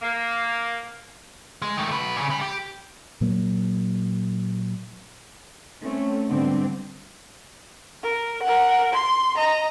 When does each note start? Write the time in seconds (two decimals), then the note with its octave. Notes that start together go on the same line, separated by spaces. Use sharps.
0.02 A#3
1.62 G#3
1.77 D#3 A3
1.91 F#3 B4
2.16 A#2 C#3
2.30 G5 B5
2.42 G4
3.21 A#2 F#3 A#3
5.83 A3 C4 C#4
6.28 G#2 D3 G3 B3 C4 D4
8.03 A#4
8.43 A#4 F#5
8.93 C6
9.35 D#5 A#5